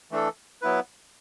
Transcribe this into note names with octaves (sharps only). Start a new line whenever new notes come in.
E3 A3 D4 A4
F#3 B3 E4 B4